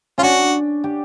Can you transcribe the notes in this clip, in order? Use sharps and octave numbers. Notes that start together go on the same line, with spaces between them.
C#4 F4
D4 F#4
G4